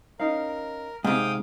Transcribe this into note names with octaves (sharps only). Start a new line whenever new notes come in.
C#4 D#4 A#4 F5
G#2 C3 G#4 F5 G5 D#6